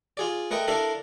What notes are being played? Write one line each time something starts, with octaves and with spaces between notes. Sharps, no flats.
F4 G#4 D5
A3 A#4 B4 D#5 G5
D4 E4 A4 A#4 F5 B5